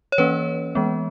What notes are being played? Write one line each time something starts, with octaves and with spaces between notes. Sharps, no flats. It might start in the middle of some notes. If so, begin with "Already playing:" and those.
C#5
E3 A#3 C#4 B4
E3 G#3 B3